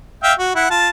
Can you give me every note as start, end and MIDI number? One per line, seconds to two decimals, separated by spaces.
0.23 0.33 76
0.23 0.33 77
0.23 0.33 79
0.39 0.51 66
0.55 0.70 64
0.55 0.70 78
0.70 0.89 65
0.70 0.89 81